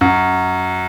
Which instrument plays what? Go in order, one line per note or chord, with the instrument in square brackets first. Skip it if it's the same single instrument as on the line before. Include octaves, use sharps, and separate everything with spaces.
[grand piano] F#2